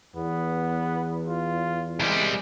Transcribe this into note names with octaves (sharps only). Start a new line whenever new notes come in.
E2 B3
F4
C2 G3 G#3